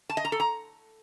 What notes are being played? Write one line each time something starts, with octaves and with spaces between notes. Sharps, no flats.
A5
D#5
A#5
A4
A#5